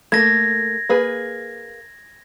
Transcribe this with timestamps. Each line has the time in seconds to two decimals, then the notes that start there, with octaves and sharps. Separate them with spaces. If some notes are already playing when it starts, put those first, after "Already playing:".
0.12 A3 A#3 G#6 A#6
0.89 A#3 G#4 B4